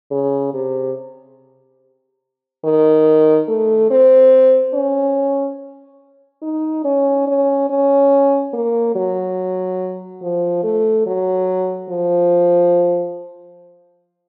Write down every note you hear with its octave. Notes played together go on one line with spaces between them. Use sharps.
C#3
C3
D#3
A3
C4
C#4
D#4
C#4
C#4
C#4
A#3
F#3
F3
A3
F#3
F3